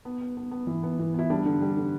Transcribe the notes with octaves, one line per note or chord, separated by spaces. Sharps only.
B3
B3
B3
B3
E3
B3
E3
B3 E4
G3 D4
D3
G3
D3